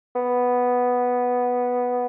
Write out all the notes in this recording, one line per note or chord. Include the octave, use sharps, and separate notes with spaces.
B3